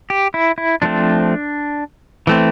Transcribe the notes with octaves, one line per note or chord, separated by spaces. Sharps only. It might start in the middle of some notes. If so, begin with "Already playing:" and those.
G4
E4
E4
F3 A3 C4 D4
E3 A3 C4